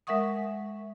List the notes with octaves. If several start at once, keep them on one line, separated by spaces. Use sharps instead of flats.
G#3 A#4 E5 F#5 C#6 D#6